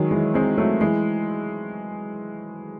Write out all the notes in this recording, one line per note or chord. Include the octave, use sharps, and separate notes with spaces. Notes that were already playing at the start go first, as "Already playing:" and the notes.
Already playing: D#3 F#3 G#3
E3 G#3
G#3 C4
F#3 A3
E3 G#3